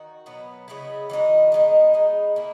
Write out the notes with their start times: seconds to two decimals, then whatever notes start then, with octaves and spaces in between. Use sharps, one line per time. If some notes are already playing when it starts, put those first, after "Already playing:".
Already playing: D#3 F#4
0.26 B2 F#3 B3
0.68 C#3 G#3 B3 E4
1.10 E3 G#3 D#4 F#4
1.52 B2 G#3 D#4
1.94 G#3 D#4 G#4 B4
2.36 A#3 E4 G#4